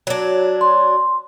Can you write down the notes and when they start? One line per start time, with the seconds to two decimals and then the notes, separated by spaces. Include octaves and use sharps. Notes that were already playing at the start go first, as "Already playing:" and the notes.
0.07 F#3 D4
0.61 C6